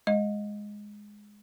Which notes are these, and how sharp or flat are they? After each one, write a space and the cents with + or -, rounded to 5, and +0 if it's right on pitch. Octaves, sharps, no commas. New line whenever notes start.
G#3 +0 D#5 +0